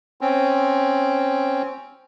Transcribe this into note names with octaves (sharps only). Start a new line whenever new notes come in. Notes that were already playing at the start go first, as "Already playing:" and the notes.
C4 C#4